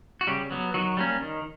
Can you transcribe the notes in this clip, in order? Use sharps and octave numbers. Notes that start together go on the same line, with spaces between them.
F#4
C#3 G3 G4
F#3 B3
D#3 F#3 F#4
G3 A#3 C#4
D#3